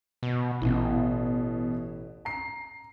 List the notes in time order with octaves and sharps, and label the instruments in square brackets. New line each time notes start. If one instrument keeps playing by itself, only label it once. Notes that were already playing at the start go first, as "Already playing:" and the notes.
[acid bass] B2
[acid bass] A1 [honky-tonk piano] B2 E3
[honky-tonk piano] A#5 C7